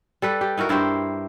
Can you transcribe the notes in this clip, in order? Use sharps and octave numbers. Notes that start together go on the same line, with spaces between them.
G3 A4 B4
G4
D#4 E4 F#4 A#4
G2 E4 G4 C5